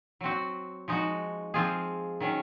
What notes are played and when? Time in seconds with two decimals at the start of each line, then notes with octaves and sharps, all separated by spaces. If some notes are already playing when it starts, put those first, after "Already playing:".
0.21 F#3 C4 F#4
0.88 F3 G#3 D#4 F#4
1.54 F3 C4 F4 G#4
2.20 D#3 F#3 C#4